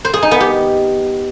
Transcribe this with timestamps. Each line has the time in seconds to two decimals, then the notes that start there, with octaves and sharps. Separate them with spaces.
0.05 C5
0.14 G#4
0.23 D#4
0.31 B3
0.40 G4